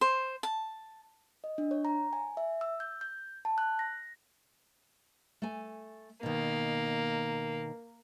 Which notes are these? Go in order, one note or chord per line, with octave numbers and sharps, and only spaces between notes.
C5
A5
D#5
D4
C#5
A#5
G#5
E5
E6
G6
G6
A5
F#6
A#6
A3 G#5
B2 D#3 A#3